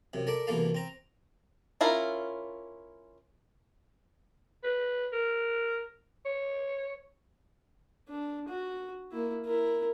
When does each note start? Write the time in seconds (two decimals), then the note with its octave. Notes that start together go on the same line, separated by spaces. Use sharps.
0.13 F#2 C3
0.27 A4 A#4 D5 E5
0.47 C2 B2 E3 A#3 A4 F5
0.75 C4 A#5
1.81 C#4 E4 F4 A#4
4.64 B4
5.12 A#4
6.25 C#5
8.09 D4
8.48 F#4
9.12 A#3 E4
9.45 E4 A#4